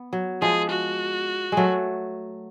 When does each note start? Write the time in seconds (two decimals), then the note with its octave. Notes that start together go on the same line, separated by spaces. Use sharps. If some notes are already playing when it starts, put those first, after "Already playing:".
Already playing: B3
0.13 F#3
0.42 F3 G#3 G#4
0.70 F#4
1.52 F#3 G#3 A3